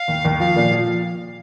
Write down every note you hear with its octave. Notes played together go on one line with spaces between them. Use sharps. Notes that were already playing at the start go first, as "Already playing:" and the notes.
Already playing: F5
D#2
D#2
F3 F5
A#2
F3